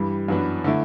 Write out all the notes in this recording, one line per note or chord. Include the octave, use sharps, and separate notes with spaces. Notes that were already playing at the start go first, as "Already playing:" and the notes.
Already playing: G2 E3 G3
F#2 E3 B3 D4
D3 A3 E4